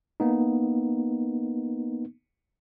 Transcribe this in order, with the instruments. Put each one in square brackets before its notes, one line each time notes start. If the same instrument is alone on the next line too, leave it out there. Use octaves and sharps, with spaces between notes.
[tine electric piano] A#3 B3 D#4